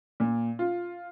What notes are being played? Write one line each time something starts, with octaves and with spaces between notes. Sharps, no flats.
A#2
F4